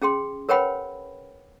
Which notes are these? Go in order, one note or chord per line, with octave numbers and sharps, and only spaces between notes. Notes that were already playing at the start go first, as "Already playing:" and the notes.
C#4 G#4 G5 C6
A#4 B4 C#5 F#5 G5 B5